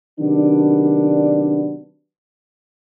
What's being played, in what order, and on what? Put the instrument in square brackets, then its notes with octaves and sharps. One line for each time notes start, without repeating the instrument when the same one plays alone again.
[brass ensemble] C3 D#3 F#3 B3 D4